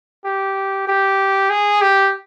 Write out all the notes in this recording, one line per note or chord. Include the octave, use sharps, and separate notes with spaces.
G4
G4
G#4
G4